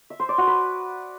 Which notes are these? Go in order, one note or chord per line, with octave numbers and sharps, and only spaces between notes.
E5
C5
D5
F#4
B4